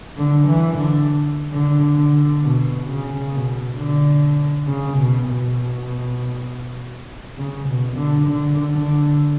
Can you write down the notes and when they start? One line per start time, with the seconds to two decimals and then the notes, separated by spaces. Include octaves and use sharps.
0.17 D3
0.47 E3
0.77 D3
1.52 D3
1.97 D3
2.42 B2
2.87 C#3
3.33 B2
3.77 D3
4.67 C#3
4.97 B2
5.28 B2
7.37 C#3
7.67 B2
7.97 D3
8.27 D3
8.72 D3